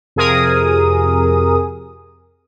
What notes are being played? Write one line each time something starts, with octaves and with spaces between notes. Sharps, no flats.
F2 C3 G#4 A#4 D#6